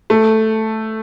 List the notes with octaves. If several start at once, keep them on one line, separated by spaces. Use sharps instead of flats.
A3